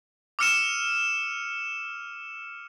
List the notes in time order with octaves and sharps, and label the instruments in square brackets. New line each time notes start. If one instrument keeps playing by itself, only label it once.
[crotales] D6 E6 F6 C#7 D#7 E7